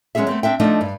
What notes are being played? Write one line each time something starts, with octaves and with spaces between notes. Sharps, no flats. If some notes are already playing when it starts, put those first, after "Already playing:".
F#3 G#3 B3 C#4 G#4 E5
A3 B3 C4
C4 D4 E5 G5
F3 A3 D4 D#4 D#5
G2